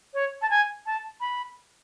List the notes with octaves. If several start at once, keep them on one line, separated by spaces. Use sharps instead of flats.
C#5
A5
G#5
A5
B5